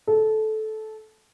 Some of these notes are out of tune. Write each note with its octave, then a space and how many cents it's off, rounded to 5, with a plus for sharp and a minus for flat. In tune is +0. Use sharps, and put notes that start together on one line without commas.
A4 -15